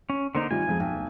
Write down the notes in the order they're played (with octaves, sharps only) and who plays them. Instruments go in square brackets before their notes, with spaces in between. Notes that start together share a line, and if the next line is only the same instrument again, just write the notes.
[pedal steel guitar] C#4
[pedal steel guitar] D3 A#3 D#4 [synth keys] C5 C6
[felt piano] C3 D#3 G3 [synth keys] F4 [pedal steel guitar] G#5
[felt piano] B1 F2 G#4 [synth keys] F3 G#3
[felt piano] B1 G5
[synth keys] D2